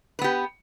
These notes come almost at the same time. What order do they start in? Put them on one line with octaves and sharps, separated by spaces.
B4 B3 G4